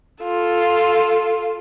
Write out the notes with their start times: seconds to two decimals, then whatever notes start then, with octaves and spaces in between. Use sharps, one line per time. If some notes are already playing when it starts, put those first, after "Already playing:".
0.23 F4 A4